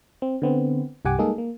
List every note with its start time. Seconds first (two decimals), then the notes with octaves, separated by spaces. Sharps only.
0.22 C4
0.42 D3 B3 C4
1.05 C2 G2 G4 F#5 G#5 D6
1.18 G3 G#3 A#3 D#4 G#4 A4
1.38 A#3